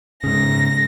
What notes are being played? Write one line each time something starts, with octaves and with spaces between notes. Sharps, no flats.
G#2 C#3 A#6